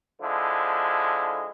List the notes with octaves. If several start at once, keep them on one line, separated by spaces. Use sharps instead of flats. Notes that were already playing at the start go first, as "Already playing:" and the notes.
D3 F3 G#3 E4